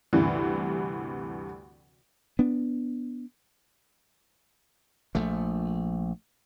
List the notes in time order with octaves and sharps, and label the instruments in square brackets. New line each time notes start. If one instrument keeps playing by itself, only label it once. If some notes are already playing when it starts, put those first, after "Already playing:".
[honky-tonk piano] D2 G2 C3 E3
[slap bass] B3 D4
A#1 F3 A3